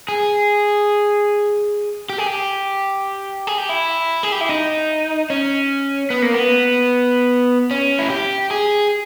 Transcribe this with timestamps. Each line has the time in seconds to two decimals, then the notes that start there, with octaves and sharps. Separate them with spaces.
0.08 G#4
2.10 G4
2.18 G#4
2.27 G4
3.47 G#4
3.58 G4
3.69 E4
4.23 G#4
4.32 G4
4.41 E4
4.49 D#4
5.30 C#4
6.10 B3
6.22 A#3
6.34 B3
7.71 C#4
7.99 E4
8.10 G4
8.51 G#4